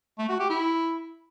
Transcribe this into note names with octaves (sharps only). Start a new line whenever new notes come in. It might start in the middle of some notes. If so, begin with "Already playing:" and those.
A3
F#4
G4
E4